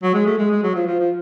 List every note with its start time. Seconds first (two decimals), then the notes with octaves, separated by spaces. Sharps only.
0.03 F#3
0.14 G#3
0.26 A3
0.38 G#3
0.51 G#3
0.63 F#3
0.75 F3
0.87 F3
0.99 F3